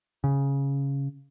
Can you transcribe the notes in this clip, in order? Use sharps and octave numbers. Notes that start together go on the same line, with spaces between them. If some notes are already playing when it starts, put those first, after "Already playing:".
C#3